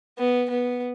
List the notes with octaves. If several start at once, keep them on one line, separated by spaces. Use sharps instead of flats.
B3
B3